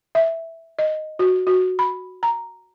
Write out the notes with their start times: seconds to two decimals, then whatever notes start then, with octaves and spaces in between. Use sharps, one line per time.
0.15 E5
0.79 D#5
1.19 F#4
1.47 F#4
1.79 B5
2.23 A#5